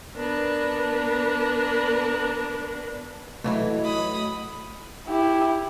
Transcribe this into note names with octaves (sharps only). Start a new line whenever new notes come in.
B3 D4 A#4 B4
E3 F#3 A3 E4 D#5
B5 D#6
E4 G4